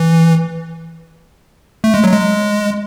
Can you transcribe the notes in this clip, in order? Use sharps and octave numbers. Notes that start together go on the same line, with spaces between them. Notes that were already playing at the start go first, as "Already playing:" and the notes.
Already playing: E3
A3
G#3
F#3
G#3